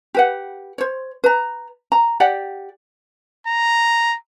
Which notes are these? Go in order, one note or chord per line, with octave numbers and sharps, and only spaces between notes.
G4 B4 F#5
C5 C#5
B4 A#5
A#5
G4 D5 F#5
A#5